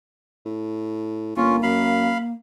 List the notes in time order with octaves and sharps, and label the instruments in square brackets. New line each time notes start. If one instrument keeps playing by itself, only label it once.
[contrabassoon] A2
[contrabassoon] G1 [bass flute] A#3 [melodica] C#4 F4
[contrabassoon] F#2 [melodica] F5 B5